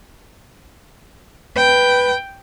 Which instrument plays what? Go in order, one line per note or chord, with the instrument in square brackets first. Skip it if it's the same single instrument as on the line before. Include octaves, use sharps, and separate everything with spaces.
[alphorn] B4 [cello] G5